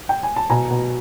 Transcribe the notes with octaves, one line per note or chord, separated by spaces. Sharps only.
G5
G#5
A5
B2 G#5 A#5
B2